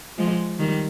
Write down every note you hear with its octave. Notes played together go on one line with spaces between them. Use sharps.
F3 G#3
D#3 G3